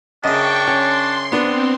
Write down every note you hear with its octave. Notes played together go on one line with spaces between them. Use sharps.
F#2 C#3 D4 D#5 G5 C#6
C#4 C6
B3 C4 D4